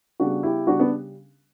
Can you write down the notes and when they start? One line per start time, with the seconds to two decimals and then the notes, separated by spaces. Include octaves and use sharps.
0.20 C#3 G3 B3 D4 F#4
0.43 E4 G4
0.67 C#3 G3 B3 D4 F#4
0.79 B3 D4